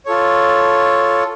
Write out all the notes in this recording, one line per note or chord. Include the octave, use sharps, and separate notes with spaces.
F4 A4 C#5